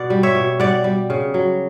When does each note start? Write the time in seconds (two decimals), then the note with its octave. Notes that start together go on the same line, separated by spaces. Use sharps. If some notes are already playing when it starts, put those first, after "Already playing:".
Already playing: B2 D5 F#5
0.10 G3
0.23 C#5 E5
0.35 B2
0.59 G3 D5 F#5
0.84 G3
1.10 C#3
1.34 F#3